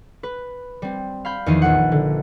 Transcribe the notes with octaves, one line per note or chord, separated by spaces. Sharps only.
B4
G3 C4
F5 B5 G6
E2 D#3 F3 D#4 D#5 C7
A#1 B4 F#5
D3